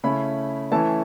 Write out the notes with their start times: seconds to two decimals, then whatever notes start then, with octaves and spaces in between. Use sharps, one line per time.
0.03 C#3 A3 C#4 E4 B5
0.71 E3 A3 C#4 E4 A5